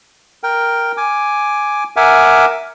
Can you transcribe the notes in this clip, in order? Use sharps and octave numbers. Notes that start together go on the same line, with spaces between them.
A#4 G5
G#5 D6
A#4 E5 F#5 G#5 D6